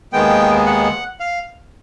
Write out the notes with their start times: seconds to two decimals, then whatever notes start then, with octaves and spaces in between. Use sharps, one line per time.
0.13 D#2 D#3 G#3 B3 G5
0.66 F#5
1.20 F5